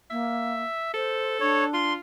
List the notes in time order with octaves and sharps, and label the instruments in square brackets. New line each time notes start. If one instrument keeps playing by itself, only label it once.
[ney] A#3 [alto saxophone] E5
[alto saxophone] A4 [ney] C5
[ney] D4 [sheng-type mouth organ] C#5
[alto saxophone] F4 [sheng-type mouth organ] C6